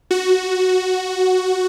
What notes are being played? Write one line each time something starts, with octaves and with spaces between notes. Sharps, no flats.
F#4